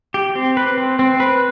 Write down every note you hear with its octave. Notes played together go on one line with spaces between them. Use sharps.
G4
C4
B4
C4
C4
B4